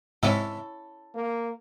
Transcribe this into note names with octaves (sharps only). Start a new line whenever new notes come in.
G#2 C3 C#4 E4 A4 E5
A#3